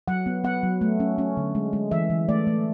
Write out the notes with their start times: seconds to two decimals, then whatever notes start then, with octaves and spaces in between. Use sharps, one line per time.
0.08 F#3 F#5
0.26 B3
0.44 B3 F#5
0.63 F#3
0.81 A3
1.00 C#4
1.18 C#4
1.37 D3
1.55 G#3
1.73 G#3
1.91 E3 E5
2.10 E3
2.29 A3 D5
2.47 A3